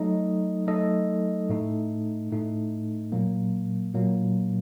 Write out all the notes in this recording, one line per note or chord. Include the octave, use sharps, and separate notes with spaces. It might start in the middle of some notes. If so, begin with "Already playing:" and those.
Already playing: F#3 A3 D#4 A4 D#5
F#3 A3 D#4 A4 D#5
A2 A3 D#4
A2 A3 D#4
A#2 F#3 A#3
A#2 F#3 A#3